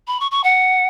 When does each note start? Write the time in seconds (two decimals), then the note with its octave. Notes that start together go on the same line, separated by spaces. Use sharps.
0.07 B5
0.20 C#6
0.31 C#6
0.44 F#5